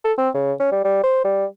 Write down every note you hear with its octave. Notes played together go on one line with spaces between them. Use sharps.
A4
C4
C#3
C#4
G3
G3
C5
G3